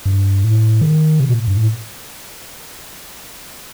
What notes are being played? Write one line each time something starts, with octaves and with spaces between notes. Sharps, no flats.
G2
A2
D#3
C3
A#2
G2
A2